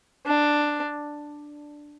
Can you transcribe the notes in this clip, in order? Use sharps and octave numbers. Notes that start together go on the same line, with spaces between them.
D4